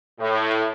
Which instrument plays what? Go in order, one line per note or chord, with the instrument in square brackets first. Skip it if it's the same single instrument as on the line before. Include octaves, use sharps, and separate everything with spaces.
[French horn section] A2